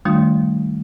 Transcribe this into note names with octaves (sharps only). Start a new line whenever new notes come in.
D#3 G3 A3 D4 F4